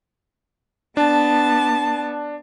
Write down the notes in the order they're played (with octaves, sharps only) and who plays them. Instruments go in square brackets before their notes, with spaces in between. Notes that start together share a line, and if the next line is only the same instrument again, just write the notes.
[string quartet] B3 A5 [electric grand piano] D4